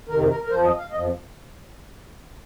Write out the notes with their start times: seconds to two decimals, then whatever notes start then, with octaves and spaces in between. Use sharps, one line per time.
0.09 F2 C3 D#3 A#4
0.30 A#4
0.43 A#4
0.50 F2 F3 C5
0.64 D#5
0.78 F5
0.91 F2 F3 D#5